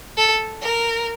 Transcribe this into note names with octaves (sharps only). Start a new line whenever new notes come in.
A4
A#4